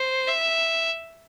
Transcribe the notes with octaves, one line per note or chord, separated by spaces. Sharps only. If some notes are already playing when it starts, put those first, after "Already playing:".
Already playing: C5
E5